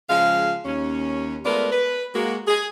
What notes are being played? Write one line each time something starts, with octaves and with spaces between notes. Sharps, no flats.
C#3 F3 G#3 F5
D#2 C#4
G#3 A3 B3 F4 A#4 D5
B4
G#3 A#3 F#4
G#4